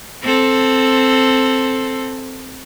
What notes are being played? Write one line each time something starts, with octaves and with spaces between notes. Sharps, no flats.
C4 A4